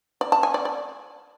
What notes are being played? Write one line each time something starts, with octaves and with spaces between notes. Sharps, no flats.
D5
A5
G#5
D5
D5